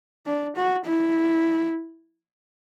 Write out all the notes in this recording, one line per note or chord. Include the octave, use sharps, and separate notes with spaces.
D4
F#4
E4